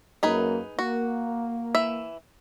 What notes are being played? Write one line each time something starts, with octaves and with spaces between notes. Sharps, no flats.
F#2 A#3 D#4 G#4 B4
A#3 F#4
E3 E5